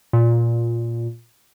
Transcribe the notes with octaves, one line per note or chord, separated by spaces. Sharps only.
A#2